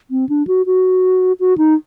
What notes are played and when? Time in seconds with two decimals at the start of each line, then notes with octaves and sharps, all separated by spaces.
0.11 C4
0.29 D4
0.47 F#4
0.66 F#4
1.40 F#4
1.58 D#4